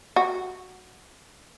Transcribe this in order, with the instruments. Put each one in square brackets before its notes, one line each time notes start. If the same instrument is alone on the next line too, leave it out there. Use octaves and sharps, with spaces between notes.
[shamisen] F#4